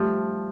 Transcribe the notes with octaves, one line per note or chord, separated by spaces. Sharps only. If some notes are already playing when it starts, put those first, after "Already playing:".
Already playing: F3 G3 A3